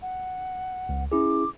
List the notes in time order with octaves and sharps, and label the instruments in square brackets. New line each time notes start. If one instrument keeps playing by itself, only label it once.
[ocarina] F#5
[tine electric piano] C#2
[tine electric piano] C#4 E4 G#4 [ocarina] D6